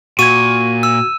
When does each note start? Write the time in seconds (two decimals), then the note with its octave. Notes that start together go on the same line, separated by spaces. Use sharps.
0.19 A#2 F#4 C#6 G#6 D#7
0.83 E6